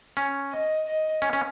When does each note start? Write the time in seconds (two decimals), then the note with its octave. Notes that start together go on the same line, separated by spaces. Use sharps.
0.17 C#4
0.53 D#5
0.87 D#5
1.22 C#4
1.33 C#4